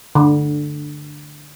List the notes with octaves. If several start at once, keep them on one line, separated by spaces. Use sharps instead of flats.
D3